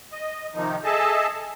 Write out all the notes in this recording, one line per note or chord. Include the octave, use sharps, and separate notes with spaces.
D#5
C3 D#3 F3 D#4
G#4 A4 D#5 E5 A5